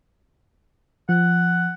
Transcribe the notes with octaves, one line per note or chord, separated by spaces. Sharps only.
F3 F#5